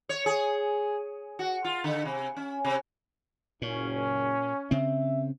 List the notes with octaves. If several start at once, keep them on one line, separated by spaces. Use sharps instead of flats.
C#5
G#4
F#4
F4
D3
C3
C#4
C3
F#1 A#2 C#4
C#3 C4 E5